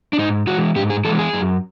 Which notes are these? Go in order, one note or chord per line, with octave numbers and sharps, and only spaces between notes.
D4
G#2 D#4
E3 G#3 F#4
G#2 G4
G#4
E3 G#3 A4
G#4
F#2